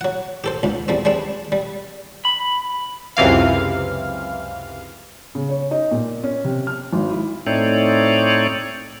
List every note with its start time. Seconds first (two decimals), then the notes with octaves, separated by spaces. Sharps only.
0.01 F#3 F#5
0.44 G4 A4 C5
0.63 C#2 G#2
0.88 E2 G3 C4
1.05 G3 G#3 C4 D4
1.52 G3
2.25 B5
3.17 C#2 F#2 C3 E3 F5
5.35 C#3
5.49 C#5
5.71 D#4
5.91 A#2
6.24 C#4
6.44 C3
6.67 F6
6.93 G#1
7.11 E4
7.47 A2 A3 C4 D#4 C#5 D5